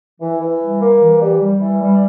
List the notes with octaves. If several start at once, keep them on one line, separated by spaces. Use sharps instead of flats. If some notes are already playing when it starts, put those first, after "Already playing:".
E3
E3
G3
A#3
E3
G3
G3
E3
G3